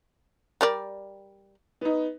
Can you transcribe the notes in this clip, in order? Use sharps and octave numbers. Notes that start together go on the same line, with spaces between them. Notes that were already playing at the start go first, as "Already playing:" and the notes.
G3 A#4 D5
B3 D#4